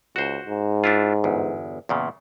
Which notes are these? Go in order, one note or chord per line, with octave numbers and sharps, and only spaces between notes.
C#2 F#4 C5
G#2
D4 E4 F4
G1 E2
E2 A#2 C#3